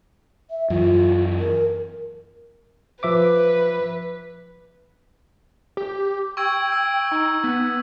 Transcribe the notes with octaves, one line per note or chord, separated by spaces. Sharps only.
E5
F#2 E3 F4
A#4
F3 B4 E5 D6
G4
G5 C#6 E6 G#6
E6
D#4
B3